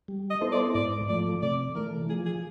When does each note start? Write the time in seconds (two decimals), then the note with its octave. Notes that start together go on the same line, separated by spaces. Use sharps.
0.08 G3
0.30 D#5
0.41 B3 E4 A4 C5
0.52 D5
0.75 G#2 D5
1.08 F3 A3 D5
1.42 C3 D5
1.75 E3 A3 A#4
2.09 F3 G#4
2.26 G#4